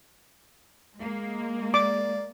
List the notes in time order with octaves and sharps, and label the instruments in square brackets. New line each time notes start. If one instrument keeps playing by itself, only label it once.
[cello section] G#3 A#3
[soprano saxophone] D5 [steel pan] D6